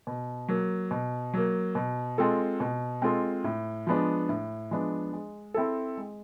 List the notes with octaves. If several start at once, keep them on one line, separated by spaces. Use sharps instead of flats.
B2
F#3 A#3
B2
F#3 A#3
B2
G#3 C4 F4 A4
B2
G#3 C4 F4 A4
A2
F3 G#3 B3 D4
A2
F3 G#3 B3 D4
G#3
C4 E4 A4
G#3